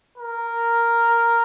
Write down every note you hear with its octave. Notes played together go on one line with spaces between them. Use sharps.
A#4